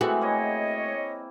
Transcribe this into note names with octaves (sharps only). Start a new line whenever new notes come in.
E3 G#3 A3 C4 F#4
A#3 E4 C#5 D#5